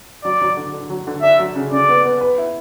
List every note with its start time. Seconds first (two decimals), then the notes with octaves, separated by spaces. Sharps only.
0.24 F#3 D5
0.41 F#3
0.57 D3
0.73 D3
0.90 F#3
1.07 D3
1.22 D4 E5
1.39 F#3
1.55 C#3
1.71 C#3 D5
1.89 B3
2.05 B3
2.21 B4
2.38 E4